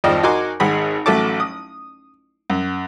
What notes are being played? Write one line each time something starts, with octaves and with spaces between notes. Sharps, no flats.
G#1 F2 F3 D5 D#5 G5
D#4 F#4 A#4 G#5 C6 D6
G#1 G#3 G#4 F#5 B5
A1 F#3 A3 A5 D6
D#6
F#2